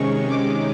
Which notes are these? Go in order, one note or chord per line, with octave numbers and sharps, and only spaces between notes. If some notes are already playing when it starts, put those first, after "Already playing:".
Already playing: C3 D#3 G#3 C#4 C#6
D6